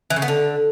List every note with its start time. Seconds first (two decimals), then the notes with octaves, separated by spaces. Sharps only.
0.10 E3
0.16 C#3
0.22 B3
0.28 D3